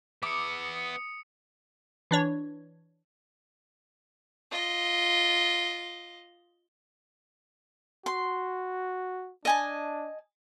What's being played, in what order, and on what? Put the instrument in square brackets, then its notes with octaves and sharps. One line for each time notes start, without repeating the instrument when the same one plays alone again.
[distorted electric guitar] B3 E5 [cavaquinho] D6 [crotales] D#6 C#7
[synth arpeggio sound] E3 D4 C#5
[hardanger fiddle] F4 D#5
[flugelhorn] F#4 [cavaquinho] C6
[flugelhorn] D4 [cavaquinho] D#5 G#5 A5